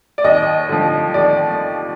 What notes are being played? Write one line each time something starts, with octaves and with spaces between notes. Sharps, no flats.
D5
D#2 D#5
D3 F3
D#2 D5